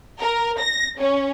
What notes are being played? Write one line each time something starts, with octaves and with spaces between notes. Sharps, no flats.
A#4
A#6
C#4